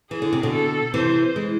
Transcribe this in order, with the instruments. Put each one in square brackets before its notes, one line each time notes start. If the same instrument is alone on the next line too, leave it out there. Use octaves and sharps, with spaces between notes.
[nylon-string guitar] E3 [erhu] G#4
[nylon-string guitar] D3
C3
B2 D3
[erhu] A4
[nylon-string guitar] C3 E3 [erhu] C5
[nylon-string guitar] E3 G#3